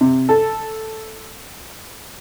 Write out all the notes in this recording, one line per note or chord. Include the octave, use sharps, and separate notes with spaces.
C3
A4